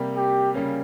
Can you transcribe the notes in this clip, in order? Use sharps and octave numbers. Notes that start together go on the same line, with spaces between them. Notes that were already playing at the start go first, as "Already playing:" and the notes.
Already playing: C3 G3 A#3
G4
C#3 G3 A#3 C#4